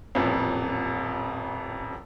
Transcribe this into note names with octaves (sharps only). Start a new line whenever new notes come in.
D#1 A1 F2